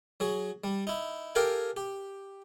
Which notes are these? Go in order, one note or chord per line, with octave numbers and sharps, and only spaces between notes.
F#3 G#4
G3
D#4 E4
G4 A4 A#4 F5 G5 G#5
G4